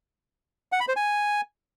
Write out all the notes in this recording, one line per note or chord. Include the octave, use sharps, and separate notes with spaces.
F#5
B5
C5
G#5